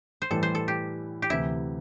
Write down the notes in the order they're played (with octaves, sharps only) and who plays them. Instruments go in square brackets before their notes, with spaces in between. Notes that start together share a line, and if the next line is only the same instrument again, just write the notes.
[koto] C5
[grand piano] A2 E3 G3 [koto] A4
[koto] C5
A4
G4
G4
[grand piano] D2 C3 E3 [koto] E4